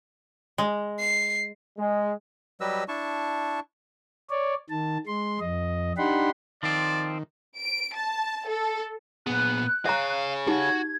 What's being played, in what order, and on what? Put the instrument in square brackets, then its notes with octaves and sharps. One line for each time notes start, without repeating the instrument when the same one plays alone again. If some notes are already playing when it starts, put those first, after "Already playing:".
[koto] G#3
[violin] C7
[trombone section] G#3
[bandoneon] F#3 G3 G4 B4 D#5 E6
D4 E4 A5 C#6
[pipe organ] C#5 D5
D#3 A5
G#3 C6
F2 D#5
D4 D#4 G4 F#5 B5 C6
[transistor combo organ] D#3 [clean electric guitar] F3 C4 [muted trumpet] D5
[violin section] D7
A5
A4
[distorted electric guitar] A#2 G#4 [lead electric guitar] B3 [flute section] F#6
[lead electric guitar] G#4 C#5 [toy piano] E5 A#5 [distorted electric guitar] F5
[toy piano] D#4 G4 [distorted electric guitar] F#4 F#5 [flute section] G#6